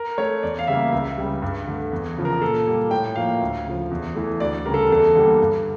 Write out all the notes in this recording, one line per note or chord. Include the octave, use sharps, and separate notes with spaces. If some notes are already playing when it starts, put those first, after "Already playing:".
Already playing: A#4
A3 C#5
E2 D5
F5
C#3 G3 A#3 E5
C#2 E5
C#3 G3
G2
D3 A3
E2
C#3 F3
A#4
A#2 A4
G3 A#3
A2 G5
F3 A#3 F5
D2
C#3 F3
E2
E3 A3
D2 D5
C#3 G3 A#4
A4
E2 A4
D3 G3 A#3
G2